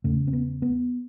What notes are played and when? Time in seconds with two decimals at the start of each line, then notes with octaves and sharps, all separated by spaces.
0.04 E2 C#3 A3
0.27 C4
0.33 B3
0.62 B3